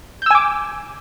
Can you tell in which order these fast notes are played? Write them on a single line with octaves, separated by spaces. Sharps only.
G6 E6 G#5 D6